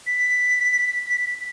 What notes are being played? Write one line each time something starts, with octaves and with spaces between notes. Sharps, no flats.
B6